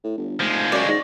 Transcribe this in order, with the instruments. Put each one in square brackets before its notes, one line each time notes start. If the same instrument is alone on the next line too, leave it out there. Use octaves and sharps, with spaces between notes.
[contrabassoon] A2
G1
[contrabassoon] F1 [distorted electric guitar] F3 G#3
[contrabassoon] F#2 [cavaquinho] C#5 D5
[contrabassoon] G#2